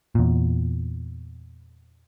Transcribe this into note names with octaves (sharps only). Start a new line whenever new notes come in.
E2 A#2